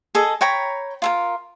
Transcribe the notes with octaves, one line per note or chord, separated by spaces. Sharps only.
G#4 A4 D#5
C#5 G5 A#5 B5
F4 A4 A#4